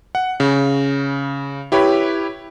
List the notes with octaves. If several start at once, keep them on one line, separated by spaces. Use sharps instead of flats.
F#5
C#3
E4 G4 B4 C#5 B5